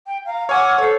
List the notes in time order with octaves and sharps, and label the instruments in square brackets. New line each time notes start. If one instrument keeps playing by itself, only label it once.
[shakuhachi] G5
[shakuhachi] F5 [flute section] A#5
[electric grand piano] C#5 G#5 [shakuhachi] F#5 [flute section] D6 E6 F6
[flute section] A4 C5 [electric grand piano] C#5